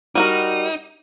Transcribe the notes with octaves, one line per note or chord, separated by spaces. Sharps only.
G3 D#4 F#4 A#4